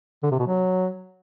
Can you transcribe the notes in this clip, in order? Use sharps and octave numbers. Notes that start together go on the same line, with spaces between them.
D3
C3
B2
F#3